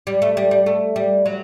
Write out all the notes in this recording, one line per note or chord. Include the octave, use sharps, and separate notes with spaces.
G3
A3
G3
G3
A3
G3
F#3